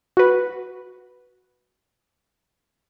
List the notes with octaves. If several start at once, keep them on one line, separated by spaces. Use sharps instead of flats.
F#4 B4